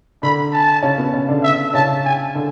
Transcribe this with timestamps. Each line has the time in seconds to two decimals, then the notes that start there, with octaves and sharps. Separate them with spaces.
0.22 D3 D4 B5
0.52 A5
0.82 C#3 C#4
0.98 B2 B3
1.13 C#3 C#4
1.28 D3 D4
1.44 E5
1.70 D4
1.74 C#3 C#4 A5
2.05 G#5
2.35 D3 D4